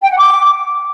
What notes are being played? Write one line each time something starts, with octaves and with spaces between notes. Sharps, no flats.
G5
F#5
D6